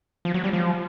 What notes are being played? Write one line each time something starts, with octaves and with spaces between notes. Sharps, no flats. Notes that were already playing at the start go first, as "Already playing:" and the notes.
F3
F#3
G3
F3